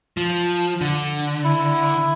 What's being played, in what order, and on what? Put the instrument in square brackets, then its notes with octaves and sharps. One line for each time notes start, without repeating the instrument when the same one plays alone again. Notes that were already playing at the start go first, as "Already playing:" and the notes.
[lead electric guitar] F3
D3
[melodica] E4